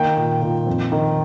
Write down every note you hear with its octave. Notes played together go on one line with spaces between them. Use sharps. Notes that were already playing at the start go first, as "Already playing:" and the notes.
Already playing: D#3 A#3 G5
A#2
A#2
F2
D#3